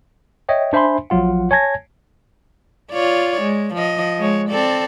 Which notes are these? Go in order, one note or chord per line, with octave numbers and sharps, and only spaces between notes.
C#5 D#5 E5 G5
D4 C5 E5 G#5 B5 C6
A#1 F3 F#3 F4 F#5
C#5 G#5 A5 G#6 A#6
F4 C#5 D5
G#3
F3 D#5
G#3 C#5
C4 A4 D5